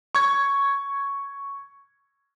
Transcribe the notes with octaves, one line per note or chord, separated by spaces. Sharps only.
C#6 G#6